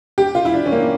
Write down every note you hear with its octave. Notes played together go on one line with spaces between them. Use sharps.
G4
F4
E4
D4
C#4
A#3